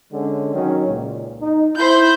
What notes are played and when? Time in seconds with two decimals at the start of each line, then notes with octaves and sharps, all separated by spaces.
0.12 D3 G#3 C#4
0.54 D#3 F#3 C#4
0.87 C#2 A#2
1.41 D#4
1.78 E4 C5 B5 G6